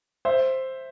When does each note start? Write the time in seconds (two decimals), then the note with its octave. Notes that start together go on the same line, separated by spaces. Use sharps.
0.25 C5 E5